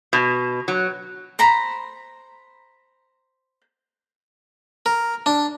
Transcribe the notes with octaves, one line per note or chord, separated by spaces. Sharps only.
B2
F#3
C5 A#5 B5
A#4
D4